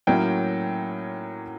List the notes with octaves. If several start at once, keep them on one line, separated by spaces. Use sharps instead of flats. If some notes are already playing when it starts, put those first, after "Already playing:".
A2 F#3 A#3 C#4 G5